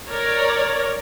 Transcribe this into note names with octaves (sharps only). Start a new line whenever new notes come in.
A#4 C#5 D5